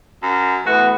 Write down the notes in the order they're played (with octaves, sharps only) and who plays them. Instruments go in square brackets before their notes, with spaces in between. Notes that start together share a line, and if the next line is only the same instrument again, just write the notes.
[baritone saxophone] F#2
[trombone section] E3 A3 B3 [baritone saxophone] F#4